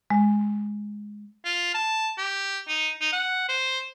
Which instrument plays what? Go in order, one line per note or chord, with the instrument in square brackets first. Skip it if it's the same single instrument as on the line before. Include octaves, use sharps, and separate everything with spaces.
[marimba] G#3
[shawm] F4
A5
G4
D#4
D#4
F#5
C5